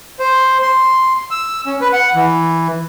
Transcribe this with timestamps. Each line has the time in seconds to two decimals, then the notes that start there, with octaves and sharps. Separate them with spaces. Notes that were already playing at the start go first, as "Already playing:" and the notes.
0.19 C5
0.62 C6
1.31 E6
1.66 C#4
1.81 B4
1.93 F#5
2.15 E3